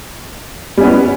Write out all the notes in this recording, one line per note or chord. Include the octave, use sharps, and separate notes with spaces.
G3 B3 C#4